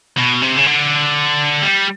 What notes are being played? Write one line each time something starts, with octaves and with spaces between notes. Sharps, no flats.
B2
C3
C#3
D3
G3